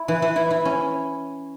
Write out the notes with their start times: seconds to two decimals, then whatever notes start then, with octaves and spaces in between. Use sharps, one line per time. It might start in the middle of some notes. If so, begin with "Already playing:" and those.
Already playing: E4
0.08 E3
0.22 E3
0.36 E4
0.51 E4
0.65 C#4